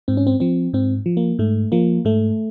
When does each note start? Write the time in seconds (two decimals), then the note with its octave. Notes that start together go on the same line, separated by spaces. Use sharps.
0.08 G#2 C4
0.17 C#4
0.27 C4
0.40 F3 C4
0.73 G#2 C4
1.06 F3
1.17 A#3
1.39 G#2 A3
1.72 F3 A#3
2.05 G#2 A3